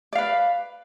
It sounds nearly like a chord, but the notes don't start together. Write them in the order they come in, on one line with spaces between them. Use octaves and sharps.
D5 F5 B4